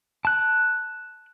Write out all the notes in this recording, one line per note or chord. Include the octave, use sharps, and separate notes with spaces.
A5 F#6